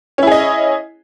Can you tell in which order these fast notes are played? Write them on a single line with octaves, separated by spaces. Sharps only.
C#4 E4 G#4 D#5